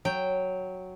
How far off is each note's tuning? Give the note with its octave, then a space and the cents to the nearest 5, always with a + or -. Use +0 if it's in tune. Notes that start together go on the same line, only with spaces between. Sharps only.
F#3 +0 G5 +0